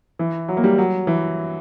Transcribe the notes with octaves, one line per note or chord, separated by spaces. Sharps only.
E3
F#3
A#3
G3
F#3
E3